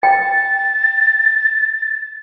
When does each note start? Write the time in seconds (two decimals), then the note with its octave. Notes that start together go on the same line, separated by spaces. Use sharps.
0.03 G5 A6